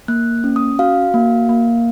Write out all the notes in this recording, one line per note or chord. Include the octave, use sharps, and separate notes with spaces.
A#3 F#6
C#4
D#6
F#4 F5
A#3
A#3